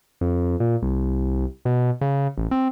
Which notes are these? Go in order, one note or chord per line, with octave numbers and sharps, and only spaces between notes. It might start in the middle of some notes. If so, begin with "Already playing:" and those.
F2
A#2
C2
B2
C#3
A1
C4